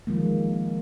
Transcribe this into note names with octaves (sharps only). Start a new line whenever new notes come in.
D#3 F3 G#3 A#3